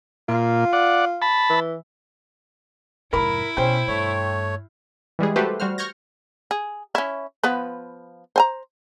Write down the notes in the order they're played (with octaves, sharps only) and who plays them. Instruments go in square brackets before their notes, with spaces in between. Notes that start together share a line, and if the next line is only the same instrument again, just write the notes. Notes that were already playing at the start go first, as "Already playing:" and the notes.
[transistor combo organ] A#2 [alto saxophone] F4
[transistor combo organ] D5 F#5
A5 B5
[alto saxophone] E3
[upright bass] F1 G#2 [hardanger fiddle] E4 [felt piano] A#4 B5
[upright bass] B2 [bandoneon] C#4 [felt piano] C5 G5
[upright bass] G2 [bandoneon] A3 C#5
[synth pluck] E3 G3 G#3 G#4
A3 F#4 G4 A4 B4 C5
G3 F#4 C5 F6
C#6 F6 G6 G#6 A#6
[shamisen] G#4
C#4 E4
F3 B3 B4
C5 G#5 A#5